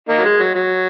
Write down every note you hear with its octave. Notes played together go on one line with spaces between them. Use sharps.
A#3 D#4
F#3
G#3
F#3
F#3